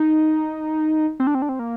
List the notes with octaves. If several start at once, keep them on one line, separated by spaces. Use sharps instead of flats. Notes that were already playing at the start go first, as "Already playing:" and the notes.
Already playing: D#4
C4
D4
C4
D4
C4
A#3